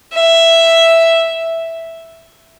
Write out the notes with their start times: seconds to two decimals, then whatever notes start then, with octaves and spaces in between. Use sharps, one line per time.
0.15 E5